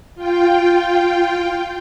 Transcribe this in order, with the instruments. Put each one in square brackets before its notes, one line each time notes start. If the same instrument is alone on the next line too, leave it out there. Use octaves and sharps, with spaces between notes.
[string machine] F4 G5